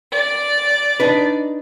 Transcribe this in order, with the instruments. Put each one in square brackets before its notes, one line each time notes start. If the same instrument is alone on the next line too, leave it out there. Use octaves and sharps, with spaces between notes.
[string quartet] D5
[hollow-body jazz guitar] D4 D#4 B4